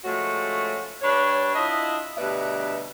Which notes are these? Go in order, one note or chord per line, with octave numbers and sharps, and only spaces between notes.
F3 G#3 A3 C#4 F#4
G3 D4 B4 C#5
D4 E4 F4 D#5
D2 G2 B2 B4 D5 E5